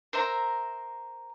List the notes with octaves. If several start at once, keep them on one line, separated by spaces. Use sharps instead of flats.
A#4 C5 E5 A#5